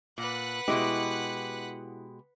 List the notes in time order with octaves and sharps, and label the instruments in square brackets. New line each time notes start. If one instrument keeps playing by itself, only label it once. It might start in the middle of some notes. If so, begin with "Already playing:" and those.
[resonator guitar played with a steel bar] A#2 [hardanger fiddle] B4 F#5
[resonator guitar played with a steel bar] B2 G#3 G4 [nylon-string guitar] E4 D#5